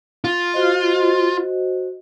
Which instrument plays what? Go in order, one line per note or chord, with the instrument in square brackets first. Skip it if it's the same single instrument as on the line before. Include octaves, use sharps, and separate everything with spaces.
[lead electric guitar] F4
[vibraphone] F#4 C5 D#5